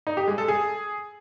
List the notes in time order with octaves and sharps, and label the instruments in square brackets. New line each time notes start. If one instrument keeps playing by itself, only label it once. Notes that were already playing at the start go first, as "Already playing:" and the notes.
[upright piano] D#4
G4
G#3
A4
G#4